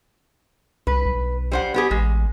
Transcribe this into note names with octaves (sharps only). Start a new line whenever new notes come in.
C2 B4
B1
G3 C5 F#5
B3 G4 G#4
A1 G#3